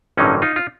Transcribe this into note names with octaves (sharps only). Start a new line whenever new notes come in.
A1 G2 D3 F#3 A#3 C#4 D#4
D#4 F4
F4